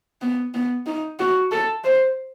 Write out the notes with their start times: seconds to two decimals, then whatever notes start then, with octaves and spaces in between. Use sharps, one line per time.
0.21 B3
0.54 B3
0.86 D#4
1.19 F#4
1.52 A4
1.84 C5